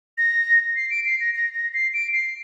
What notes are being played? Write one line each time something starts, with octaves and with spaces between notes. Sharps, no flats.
A#6
C7
D7
C7
A#6
A#6
A#6
C7
D7
C7